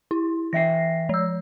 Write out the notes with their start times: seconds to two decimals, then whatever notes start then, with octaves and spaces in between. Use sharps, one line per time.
0.11 E4
0.53 E3 E5 G5 A#6 C7
1.09 F3 E6